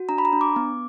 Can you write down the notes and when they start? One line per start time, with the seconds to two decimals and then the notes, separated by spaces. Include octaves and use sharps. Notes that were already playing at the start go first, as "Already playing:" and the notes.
Already playing: F#4
0.09 D4 A#5
0.18 B5
0.25 A#5
0.33 D4
0.41 D6
0.56 B3